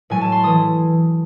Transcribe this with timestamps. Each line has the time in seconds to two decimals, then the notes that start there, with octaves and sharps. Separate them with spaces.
0.10 A2 F#3 A3 G#5
0.21 A5
0.32 C6
0.43 E3 A3 D#6